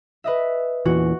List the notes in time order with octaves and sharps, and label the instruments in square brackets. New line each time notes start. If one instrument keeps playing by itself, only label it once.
[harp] B4 D#5 E5
[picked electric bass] E2 A#2 E3 [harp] F#4